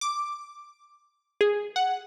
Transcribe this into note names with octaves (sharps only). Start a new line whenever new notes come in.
D6
G#4
F#5